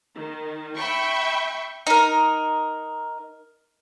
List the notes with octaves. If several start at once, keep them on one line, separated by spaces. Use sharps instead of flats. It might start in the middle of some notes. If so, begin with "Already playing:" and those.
D#3
E5 G5 B5 C#6
D#4 A#4